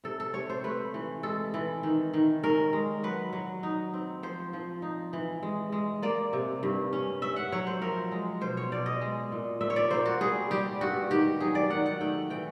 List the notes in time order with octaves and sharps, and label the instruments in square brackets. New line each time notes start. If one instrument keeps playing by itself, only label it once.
[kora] C3 A4
A4
C3 C#5
C5
A3 B4
E3
G#3 A4
E3
D#3
D#3
C#4 A#4
G#3
F#3 B4
F#3
D#4
C4
F3 C5
F3
D#4
E3
G#3
G#3
A#3 D5
C3
G2
C#4
C#4 E5
F#5
F#3 C#5
C5
F3 A#4
G#3
B2 C5
C#5
B2 D5
D#5
G#3
A#2
A#2 E5
C#5
D5
A#3 C5
F#4
G3 G#4
G3 G4
G2 F#4
D#3 G4
F#3 G#4
D5
D#3 F#5
F#5
A3 G5
E3 G5